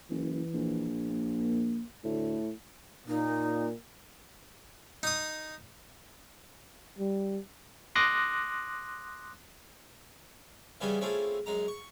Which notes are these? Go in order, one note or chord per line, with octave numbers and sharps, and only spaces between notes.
F#1 E3
A#1
A#3
D2 A2
A#2 D#4
D#4 D#6
G3
C6 D6 D#6 F#6 A#6
C#3 E3 G3 B3 C#4 G#4
A3 C4 C#4 E4 F4 G#4
F#2 G#3 A#5
C#6